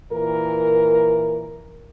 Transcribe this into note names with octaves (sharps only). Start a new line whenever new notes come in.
A#2 E3 A#4